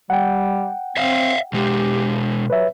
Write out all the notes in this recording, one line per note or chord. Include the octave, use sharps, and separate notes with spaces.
G3 F#5 G5
C4 C#5 E5 F5
B2 G#3 G4
F#3 B4 C#5 E5